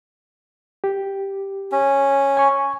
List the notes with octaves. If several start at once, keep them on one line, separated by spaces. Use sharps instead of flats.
G4
C#4
G#5 C#6